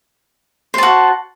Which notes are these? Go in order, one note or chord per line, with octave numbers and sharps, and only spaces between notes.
F#4 C5 A5